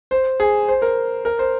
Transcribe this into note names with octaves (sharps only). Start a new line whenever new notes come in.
C5
G#4
C5
A#4
A#4
C5